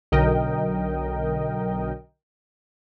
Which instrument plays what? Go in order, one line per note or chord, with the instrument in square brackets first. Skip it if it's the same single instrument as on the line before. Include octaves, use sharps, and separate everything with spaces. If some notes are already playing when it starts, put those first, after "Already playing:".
[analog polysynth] B1 D3 F#3 A#4 D#5 G5